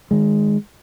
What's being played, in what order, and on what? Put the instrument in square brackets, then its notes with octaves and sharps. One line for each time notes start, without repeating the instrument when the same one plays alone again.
[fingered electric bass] D#3 G#3